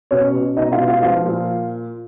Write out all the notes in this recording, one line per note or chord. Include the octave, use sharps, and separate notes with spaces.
B2 C#4 C#5
B2
B2 D#4 D#5
F4 F5
B2
F4 F5
F3 F4 F5
A#2